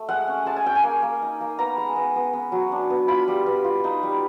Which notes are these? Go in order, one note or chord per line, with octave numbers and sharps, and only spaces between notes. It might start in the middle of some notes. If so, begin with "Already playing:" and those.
Already playing: A3
G#3 F#5
C#4
G#3 A5
G#5
C#4 G5
G#5
A#3
A#3
D#4
A#3
B3 A#5
G#3
B3
B3
B3
F#3
D4
B3
F4 B5
G3
B3
F4
D#4
G3